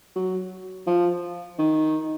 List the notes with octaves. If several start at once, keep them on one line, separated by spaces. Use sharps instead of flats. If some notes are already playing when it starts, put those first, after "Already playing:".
F#3
F3
D#3